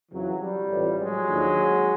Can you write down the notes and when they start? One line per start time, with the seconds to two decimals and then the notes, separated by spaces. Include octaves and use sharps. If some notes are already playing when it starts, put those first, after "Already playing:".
0.12 F2 C#3 E3 F#3
0.41 G3
0.69 A1 A2 F3
0.97 F#3 G#3
1.26 D#2 D3 F3